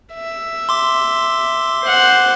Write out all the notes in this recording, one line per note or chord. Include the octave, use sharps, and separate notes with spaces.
E5
C6 D6
C5 F#5